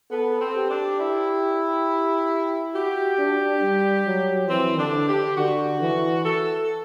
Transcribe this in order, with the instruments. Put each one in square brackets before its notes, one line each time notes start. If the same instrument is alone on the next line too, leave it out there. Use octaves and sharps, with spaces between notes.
[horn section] B3 [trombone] A4
[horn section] C4
[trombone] G4
[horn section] D4
E4
[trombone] F#4 [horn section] G4
[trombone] D4
G3
F#3
[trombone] E3 [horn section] C4
[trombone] D3 [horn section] D4
[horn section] G4
[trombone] D3 [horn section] F#4
[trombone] E3
[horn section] A4